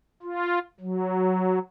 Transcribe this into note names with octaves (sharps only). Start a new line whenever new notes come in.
F4
F#3